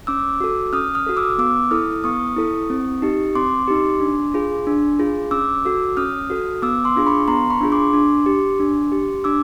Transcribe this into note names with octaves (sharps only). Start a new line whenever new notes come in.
C#4 D6 E6
F#4 A4
C#4 D#6 F6
D#6 F6
F#4 A4
D6 E6
B3 D6 E6
E4 A4 D#6 F6
B3 C#6 D#6
E4 A4
C4
D#4 G4
C4 C6 D6
D#4 G4
D4
F4 G#4
D4
F4 G#4
C#4 D6 E6
F#4 A4
C#4 D#6 F6
F#4 A4
B3 D6 E6
C6 D6
D4 F4 G#4
B5 C#6
B3 A#5 C6
B5 C#6
D4 F4 G#4
C6 D6
D4
G4
D4
G4
D4 D6 E6